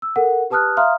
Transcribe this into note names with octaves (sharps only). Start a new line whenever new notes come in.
E6
A4 A#4 F#5
G4 B4 A5 D#6 F6 F#6
E5 F5 A#5 C6 D#6 F6